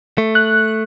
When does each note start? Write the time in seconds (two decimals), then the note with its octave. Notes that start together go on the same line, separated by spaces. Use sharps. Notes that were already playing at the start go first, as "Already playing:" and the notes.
0.18 A3
0.35 F#6